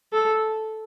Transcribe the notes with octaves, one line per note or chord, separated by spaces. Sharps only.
A4